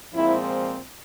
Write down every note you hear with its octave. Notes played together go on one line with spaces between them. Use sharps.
A#2 F3 G#3 C4 E4